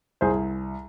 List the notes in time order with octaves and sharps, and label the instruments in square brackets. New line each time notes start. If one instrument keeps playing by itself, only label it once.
[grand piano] C2 G#4 C5